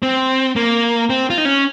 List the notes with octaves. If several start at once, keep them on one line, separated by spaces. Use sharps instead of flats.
C4
A#3
C4
F4
D#4
C#4